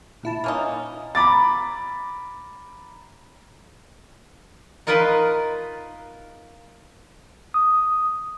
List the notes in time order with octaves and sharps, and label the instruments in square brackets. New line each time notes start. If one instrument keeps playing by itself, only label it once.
[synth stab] A#2 E4 A5
[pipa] A#3 C#4 D#4
[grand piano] A#5 B5 D6 A6
[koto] D#4 F4 A#4 B4 D#5
[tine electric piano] D#6